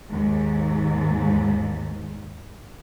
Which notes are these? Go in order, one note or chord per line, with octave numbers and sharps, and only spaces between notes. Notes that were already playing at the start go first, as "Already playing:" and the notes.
D#2 G#2